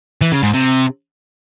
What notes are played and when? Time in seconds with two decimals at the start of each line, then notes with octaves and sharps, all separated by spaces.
0.22 E3
0.32 C#3
0.43 G#2
0.54 C3